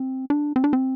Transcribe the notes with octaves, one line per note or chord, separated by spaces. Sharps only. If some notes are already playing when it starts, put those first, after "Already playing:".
Already playing: C4
D4
C4
D4
C4